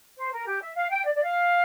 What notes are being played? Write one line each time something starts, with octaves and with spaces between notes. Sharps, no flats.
C5
A#4
G4
E5
F5
G5
D5
D5
F5